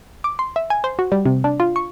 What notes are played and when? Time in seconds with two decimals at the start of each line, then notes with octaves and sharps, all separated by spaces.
0.24 D6
0.39 C6
0.56 E5
0.70 G#5
0.84 C5
0.99 F#4
1.12 G3
1.26 C3
1.44 D4
1.60 F4
1.76 C#6